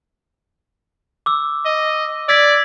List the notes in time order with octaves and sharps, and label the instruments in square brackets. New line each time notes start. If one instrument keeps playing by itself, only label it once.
[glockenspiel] D6 E6
[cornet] D#5
[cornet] D5 [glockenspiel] E6 G#6 B6